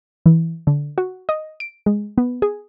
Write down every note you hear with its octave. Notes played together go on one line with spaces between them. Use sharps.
E3
D3
F#4
D#5
D7
G#3
B3
G#4